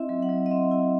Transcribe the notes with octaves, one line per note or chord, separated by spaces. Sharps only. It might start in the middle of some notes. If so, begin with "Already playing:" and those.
Already playing: C4 E4 D#5 E5
F#3
F#5
F#3
D#5
C4 E5
E4